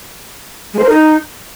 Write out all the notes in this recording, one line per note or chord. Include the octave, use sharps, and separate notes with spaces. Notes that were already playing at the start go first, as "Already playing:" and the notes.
G#3
C5
A#4
D#4